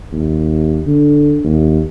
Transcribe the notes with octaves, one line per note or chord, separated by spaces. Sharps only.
D#2
D3
D#2